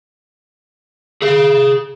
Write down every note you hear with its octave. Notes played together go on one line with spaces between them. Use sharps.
G#4 F5